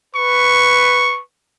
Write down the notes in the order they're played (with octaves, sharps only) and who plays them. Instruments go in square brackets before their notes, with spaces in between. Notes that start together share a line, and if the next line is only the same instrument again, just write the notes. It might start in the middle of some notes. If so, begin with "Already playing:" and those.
[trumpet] B4 [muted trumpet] C#6